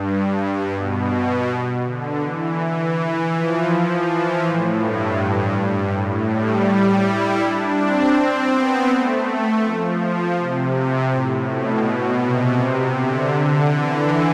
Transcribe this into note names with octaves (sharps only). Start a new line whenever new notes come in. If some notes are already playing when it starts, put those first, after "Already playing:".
Already playing: G2
B2
D3
E3
E3
F3
E3
A2
G2
G2
G2
A2
G3
E4
D4
C4
B3
A3
F3
C3
A2
B2
C3
D3
E3